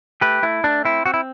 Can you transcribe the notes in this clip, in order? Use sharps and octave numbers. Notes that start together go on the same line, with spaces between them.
A3 G4 B4
A3 E4
A3 D4
C4 E4
C4 F#4
E4